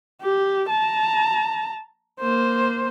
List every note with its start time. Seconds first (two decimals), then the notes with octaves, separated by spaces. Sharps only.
0.22 G4
0.69 A5 A#5
2.21 A#3 C5